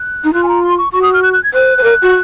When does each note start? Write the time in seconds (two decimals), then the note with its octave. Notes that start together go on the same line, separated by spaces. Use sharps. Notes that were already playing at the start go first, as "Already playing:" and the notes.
Already playing: F#6
0.24 D#4
0.33 F4 F#6
0.43 G#5
0.49 A#5
0.63 C6
0.78 C#6
0.93 F#4 C#6
1.03 D#6
1.13 F6
1.23 F#6
1.33 F#6
1.44 G#6
1.54 C5 F#6
1.78 C5
1.83 A#4
2.02 F#4